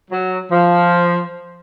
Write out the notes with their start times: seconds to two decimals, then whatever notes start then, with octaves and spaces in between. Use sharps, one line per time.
0.11 F#3
0.50 F3